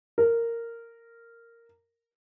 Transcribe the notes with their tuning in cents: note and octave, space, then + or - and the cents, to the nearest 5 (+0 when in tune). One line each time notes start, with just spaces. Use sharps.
A#4 -10